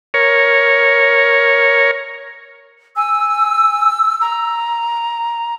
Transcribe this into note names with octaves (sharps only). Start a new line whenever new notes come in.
A#4 C#5
G#5 E6
A#5